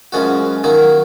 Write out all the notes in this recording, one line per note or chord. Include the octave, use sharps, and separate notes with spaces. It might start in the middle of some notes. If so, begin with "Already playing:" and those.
F#2 F3 G#3 C#4 F#4
D#3 F#3 A#3 D#4